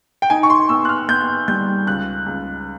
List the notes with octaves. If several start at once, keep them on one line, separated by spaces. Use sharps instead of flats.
G5
D#4 G#5
C#6
C6
B3 E6
F#6
F6
B3 G6
G3 G6
C#2 F#6
C#2